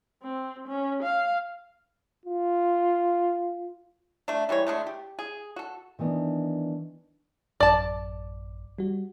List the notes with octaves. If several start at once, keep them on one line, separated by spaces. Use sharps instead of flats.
C4
C#4
F5
F4
A3 D4
E3 G3 G#3 C#5
D3 G#3 A3
G4
G#4
F#4 A4
D#3 E3 B3 D4 D#4
A1 F#2 D5 A5
G3 F#4